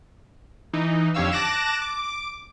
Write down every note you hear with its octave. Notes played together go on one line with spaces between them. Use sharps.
E3 D#4
F2 D3 G4 C#5 F5 E6
A5 D6 F#6 A#6 D7 E7
D6